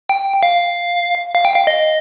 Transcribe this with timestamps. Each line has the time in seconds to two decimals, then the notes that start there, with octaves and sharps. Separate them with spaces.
0.09 G5
0.43 F5
1.35 F5
1.45 G5
1.56 F5
1.67 D#5